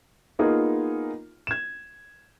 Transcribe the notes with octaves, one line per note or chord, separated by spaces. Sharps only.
A#3 B3 D#4 F4 G#4 A#4
G#6 E7